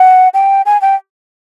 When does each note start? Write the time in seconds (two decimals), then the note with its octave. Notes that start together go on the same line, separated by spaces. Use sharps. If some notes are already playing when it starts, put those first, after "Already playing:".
Already playing: F#5
0.34 G5
0.66 G#5
0.81 G5